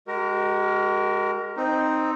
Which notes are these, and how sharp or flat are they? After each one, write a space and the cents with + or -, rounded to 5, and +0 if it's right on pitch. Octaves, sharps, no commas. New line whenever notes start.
G#3 -5 F#4 +40 A#4 +0
C4 +0 D#4 +0